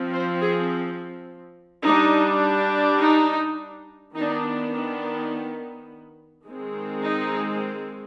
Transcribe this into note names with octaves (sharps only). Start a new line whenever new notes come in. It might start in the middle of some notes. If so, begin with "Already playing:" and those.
Already playing: F3 C4
C5
G#4
G3 D4 D#4
D#4
D#3 B3 D4 D#4
D4
D#3 G#3 C4
D#4